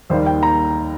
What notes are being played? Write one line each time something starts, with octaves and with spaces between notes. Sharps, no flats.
D#2 D#3 G3 A#3 C5
G5
A#5